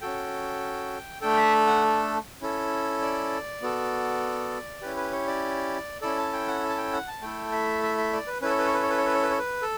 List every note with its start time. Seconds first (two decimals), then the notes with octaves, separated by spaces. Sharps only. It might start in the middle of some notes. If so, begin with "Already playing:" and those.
0.01 C#4 F#4 A4 G5
1.21 A3 D4 A4 G5
1.37 E5
1.67 F#5
2.42 C#4 E4 A4
3.02 D5
3.62 B3 F#4 A4
4.82 C#4 E4 G4 B4
4.97 B4
5.12 C#5
5.27 D5
6.02 C#4 E4 A4 D5
6.18 A5
6.33 G5
6.48 F#5
6.70 A5
6.77 G5
6.93 F#5
7.07 A5
7.22 A3 E4 A4 G5
7.52 E5
7.83 E5
7.97 E5
8.13 D5
8.27 B4
8.42 C#4 E4 A4 B4
8.50 C#5
8.58 B4
8.67 C#5
8.74 B4
8.83 C#5
8.90 B4
8.98 C#5
9.06 B4
9.15 C#5
9.23 B4
9.31 C#5
9.39 B4
9.62 A4